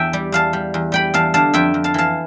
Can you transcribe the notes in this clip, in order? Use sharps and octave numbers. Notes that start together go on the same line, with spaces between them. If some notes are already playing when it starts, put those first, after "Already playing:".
Already playing: E2 E5 G5 A5
G3
E2 F5 A5
G3
E2
G3 G5 B5
E2 F5 A5
D3 F5 A5
F2 E5 G5
F2
F5 A5
E3 F5 A5